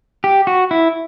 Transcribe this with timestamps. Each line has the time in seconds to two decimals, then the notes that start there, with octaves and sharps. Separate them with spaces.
0.24 G4
0.47 F#4
0.71 E4